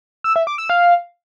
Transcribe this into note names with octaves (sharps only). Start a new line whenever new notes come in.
E6
E5
D6
E6
F5